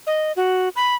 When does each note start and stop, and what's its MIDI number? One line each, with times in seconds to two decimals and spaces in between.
0.07 0.32 75
0.36 0.69 66
0.76 0.95 83